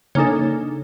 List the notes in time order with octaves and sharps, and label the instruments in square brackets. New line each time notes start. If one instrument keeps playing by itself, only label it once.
[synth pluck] C#3 A#3 D4 D#4 A4